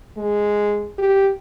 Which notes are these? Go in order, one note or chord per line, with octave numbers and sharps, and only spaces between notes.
G#3
G4